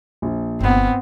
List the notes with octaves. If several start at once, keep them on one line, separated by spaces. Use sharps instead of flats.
A#1
G1 B3 C4